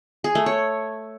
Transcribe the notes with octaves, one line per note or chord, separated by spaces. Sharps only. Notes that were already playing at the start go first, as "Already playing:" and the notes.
G#4
A3
C#5